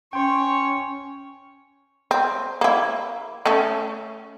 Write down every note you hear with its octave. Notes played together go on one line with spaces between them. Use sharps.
C#4 C#5 G5 C6
C4
A#3 E4
A3 C#4 A4